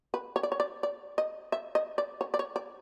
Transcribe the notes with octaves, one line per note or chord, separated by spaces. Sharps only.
B4
C#5
D5
C#5
D5
D5
D#5
E5
D#5
D5
C#5
D5
C#5
D5